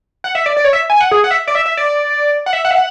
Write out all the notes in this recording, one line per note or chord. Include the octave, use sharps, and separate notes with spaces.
F#5
E5
D5
D5
C#5
E5
G#5
F#5
G#4
F#5
E5
D5
E5
E5
D5
F#5
E5
F#5
E5
F#5